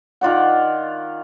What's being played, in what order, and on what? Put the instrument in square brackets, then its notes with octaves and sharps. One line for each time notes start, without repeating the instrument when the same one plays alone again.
[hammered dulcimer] D#3 F4 D5 F#5